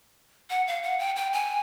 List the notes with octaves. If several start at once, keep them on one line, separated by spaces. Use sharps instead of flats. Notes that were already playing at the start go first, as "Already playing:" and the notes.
F#5
F5
F#5
G5
G5
G#5